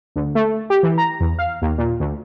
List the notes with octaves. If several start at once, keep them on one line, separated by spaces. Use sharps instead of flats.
D2
A3
G4
E3
A#5
E2
F5
D#2
A#2
D2